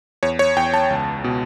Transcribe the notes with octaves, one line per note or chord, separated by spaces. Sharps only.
E2 C#5
C#5
E2 G5
A5
C#2
B2